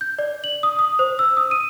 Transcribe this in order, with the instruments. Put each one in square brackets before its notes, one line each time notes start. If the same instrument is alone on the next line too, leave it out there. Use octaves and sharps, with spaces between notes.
[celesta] G6
D5
F#7
D#6
D#6
C5
E6
D#6
D#7